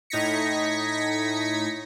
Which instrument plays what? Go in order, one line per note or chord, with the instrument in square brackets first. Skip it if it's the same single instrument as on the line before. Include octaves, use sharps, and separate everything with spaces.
[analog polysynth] A2 D#4 G#6 A#6 B6 C#7